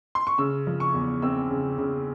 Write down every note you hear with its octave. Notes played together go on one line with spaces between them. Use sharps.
C6
C#6
C#3 E6
F3
C#6
E2
C4 E6
C#3
C#3